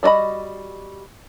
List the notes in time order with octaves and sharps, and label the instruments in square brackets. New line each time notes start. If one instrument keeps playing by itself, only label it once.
[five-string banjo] G3 D4 F#4 D#5 B5